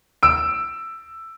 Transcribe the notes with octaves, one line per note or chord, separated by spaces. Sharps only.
E6 D7